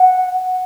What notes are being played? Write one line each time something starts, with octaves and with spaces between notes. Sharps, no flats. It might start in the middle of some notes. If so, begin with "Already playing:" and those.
Already playing: F#5